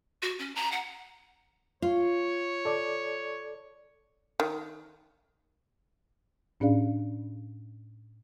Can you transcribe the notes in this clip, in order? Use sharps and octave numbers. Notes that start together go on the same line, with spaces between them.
F#4
C#4
A#5
F#5
F4 C#5
A4 D5
D#3
A2 C#4 D4 G#4 D5 F5